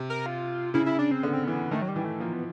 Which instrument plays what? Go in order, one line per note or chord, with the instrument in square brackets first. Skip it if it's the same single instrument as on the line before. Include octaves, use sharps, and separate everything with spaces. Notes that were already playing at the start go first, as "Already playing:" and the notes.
Already playing: [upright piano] C3
[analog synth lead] A#4
F4
[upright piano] C#3 [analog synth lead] E4
[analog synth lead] E4
D4
C4
[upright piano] D3 [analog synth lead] B3
[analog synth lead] C4
[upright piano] E3 [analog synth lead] B3
[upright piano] D#3 [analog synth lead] A3
[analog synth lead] F#3
G3
[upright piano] E3
[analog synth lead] A3
[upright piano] F3 [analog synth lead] A#3
[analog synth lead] B3